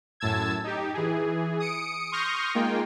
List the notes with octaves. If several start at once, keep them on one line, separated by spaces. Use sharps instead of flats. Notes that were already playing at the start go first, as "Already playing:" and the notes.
F#2 A2 A5 E6 G#6
D#4 G4
E3 G#4
D#6 C#7 D7
C6 C#6 D#6 F6 G6 A#6
G#3 A#3 D#4 F4 G5